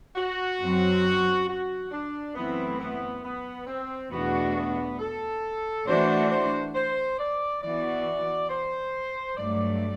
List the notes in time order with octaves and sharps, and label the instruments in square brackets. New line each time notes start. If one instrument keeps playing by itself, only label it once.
[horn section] F#4
[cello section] F#2 F#3 C4
[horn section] F#4
D4
[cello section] F#2 E3 A3 C4 E4 [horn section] B3
[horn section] B3
B3
C4
[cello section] E2 B2 A3 D4 F#4 [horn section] B3
[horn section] B3
A4
[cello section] E3 A3 D4 F#4 [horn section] C5
[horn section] C5
C5
D5
[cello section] E3 B3 F#4 [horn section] D5
[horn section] C5
[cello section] G2 F#3 A3 [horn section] D5